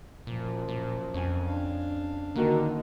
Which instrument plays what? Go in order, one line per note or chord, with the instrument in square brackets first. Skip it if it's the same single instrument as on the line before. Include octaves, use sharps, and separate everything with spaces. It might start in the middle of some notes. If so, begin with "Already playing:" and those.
[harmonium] F#2 F3 [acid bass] A#2
[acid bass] A#2
[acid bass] F2 [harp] C#4 G#5
[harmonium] D4 F5
[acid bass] D3 [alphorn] D#3 [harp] A#3 F#4 A#4